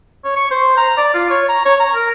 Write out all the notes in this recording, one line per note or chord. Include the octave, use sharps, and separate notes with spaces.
C#5
C#6
C5
A#5
D5
F4
C#5
A#5
C#5
A#5
A#4